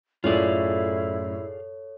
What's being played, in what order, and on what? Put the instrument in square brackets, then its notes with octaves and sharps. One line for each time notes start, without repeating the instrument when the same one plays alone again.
[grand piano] F#2 A2 [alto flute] E4 [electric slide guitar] F4 G#4 D5 [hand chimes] A4 C#5